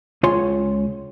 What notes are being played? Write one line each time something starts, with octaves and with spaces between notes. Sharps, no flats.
C#2 F4 C#5 G#5 C6